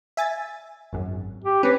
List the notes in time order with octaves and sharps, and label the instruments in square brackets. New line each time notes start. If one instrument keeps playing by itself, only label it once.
[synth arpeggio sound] E5 G#5 A6
G#1 F#2
[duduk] G4
[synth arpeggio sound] C4 C#4 [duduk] B4